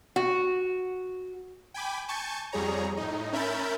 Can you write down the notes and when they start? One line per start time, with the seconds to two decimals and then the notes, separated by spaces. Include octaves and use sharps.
0.16 F#4
1.74 G5 G#5 B5 D6
2.08 G#5 A5 C#6 G6 A6 C#7
2.52 F2 G3 G#4 C#5 A#5
2.97 A2 D#4
3.33 C#4 A#4 E5 B5 G6 A6